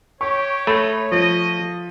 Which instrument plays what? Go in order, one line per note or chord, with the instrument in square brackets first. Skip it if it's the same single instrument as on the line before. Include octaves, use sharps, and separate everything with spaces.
[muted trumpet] G4 [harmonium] C#5 [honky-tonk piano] C#6
[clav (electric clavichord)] A3 [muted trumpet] D#4 [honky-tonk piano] B5
[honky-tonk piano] F3 [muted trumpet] D#5